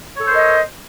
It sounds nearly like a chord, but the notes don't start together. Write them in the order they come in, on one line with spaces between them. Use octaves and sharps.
C#5 A4 C5 A#4 D#5